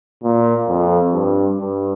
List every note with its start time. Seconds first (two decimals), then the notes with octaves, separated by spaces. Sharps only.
0.24 A#2
0.69 F2
1.14 G2
1.60 G2